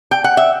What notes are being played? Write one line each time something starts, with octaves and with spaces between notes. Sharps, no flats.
G5
F#5
E5